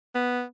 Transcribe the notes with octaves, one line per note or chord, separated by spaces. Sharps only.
B3